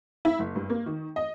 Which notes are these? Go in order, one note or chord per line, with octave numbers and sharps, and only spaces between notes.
E4
F#1
G2
A#3
D#3
D#5